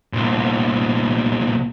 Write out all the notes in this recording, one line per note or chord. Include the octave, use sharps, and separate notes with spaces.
C2 A#2